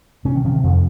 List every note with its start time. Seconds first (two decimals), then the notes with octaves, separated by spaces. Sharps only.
0.25 C3 C#4
0.35 D#3
0.45 C3 F3
0.54 D#3
0.64 F2 F3